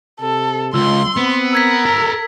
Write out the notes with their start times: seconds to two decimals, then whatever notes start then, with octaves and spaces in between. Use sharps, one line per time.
0.21 C3 A4
0.74 C#2 F4 C6 E6
1.16 B3 C4
1.53 A#4 E6 G#6 B6
1.86 A4 A#5